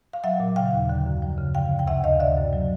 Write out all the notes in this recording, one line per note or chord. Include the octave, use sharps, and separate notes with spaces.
F5
F#3 E5 F#5
A#2
C#3 F5 G5
D#2
D3
F#2
F3
C#3
D3 F5 G5
D2
G5
C3 E5 F#5
D2 D#5 F5
D3 D5 E5
F#2
F#3